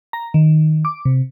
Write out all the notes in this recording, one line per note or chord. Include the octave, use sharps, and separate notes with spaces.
A#5
D#3
D6
C3